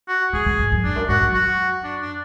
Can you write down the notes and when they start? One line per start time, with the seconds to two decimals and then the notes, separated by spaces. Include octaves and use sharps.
0.08 F#4
0.33 D3 G#4
0.46 C#3
0.59 G#2
0.72 F#2
0.84 E2 D4
0.96 F#2
1.09 G#2 F#4
1.22 F#2
1.34 F#4
1.84 D4
2.01 D4